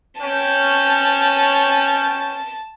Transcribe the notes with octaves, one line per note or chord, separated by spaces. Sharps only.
C#4 G5 A5